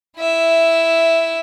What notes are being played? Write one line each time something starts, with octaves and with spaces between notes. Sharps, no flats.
E4 E5